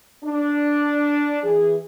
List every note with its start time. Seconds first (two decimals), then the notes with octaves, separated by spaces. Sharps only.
0.25 D4
1.43 E3 G#4